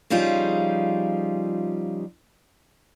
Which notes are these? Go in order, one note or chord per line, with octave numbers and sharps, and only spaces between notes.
C#3 F3 G3 D#4 F4 G#4